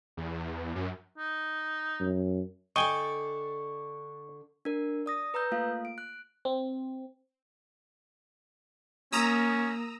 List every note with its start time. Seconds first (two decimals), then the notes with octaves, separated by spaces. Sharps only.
0.17 E2
0.75 F#2
1.18 D#4
2.00 F#2
2.76 D3 D4 A4 D#5 G5 G#5 C#6
4.65 D4 A#4
5.06 D5 D#6 A#6
5.34 B4 A#5 E6 G6
5.52 A3 A#3 F4 F5
5.85 D7
5.98 F#6
6.45 C4
9.13 A#3 C#4 A#5 D#6 E6